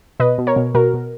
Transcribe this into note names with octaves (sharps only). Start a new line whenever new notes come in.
B2 B4 D#5
B2
A#4 C#5
B2
B2 F#4 A#4
B2